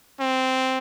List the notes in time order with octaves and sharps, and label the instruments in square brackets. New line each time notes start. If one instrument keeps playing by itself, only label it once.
[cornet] C4